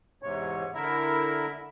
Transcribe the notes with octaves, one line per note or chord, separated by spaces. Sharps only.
E2 G#2 C3 C#5
D3 E4 A#4 E5